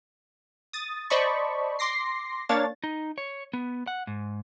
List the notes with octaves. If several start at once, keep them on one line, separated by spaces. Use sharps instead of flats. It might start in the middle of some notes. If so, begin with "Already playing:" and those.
D#6 A6
C5 D5 D#5 A5 B5 C#6
C6 D6 A#6 C7
A#3 D4 C#5 F5 A6
D#4
C#5
B3
F#5
G#2